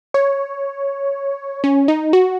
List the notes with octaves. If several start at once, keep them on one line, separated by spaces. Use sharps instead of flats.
C#5
C#4
D#4
F#4